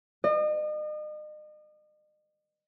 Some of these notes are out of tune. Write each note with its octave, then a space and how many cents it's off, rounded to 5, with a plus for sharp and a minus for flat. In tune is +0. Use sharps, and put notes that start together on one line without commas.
D#5 -40